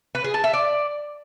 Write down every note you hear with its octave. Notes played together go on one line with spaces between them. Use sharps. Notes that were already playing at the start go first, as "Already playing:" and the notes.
B4
G#4
A5
E5
D5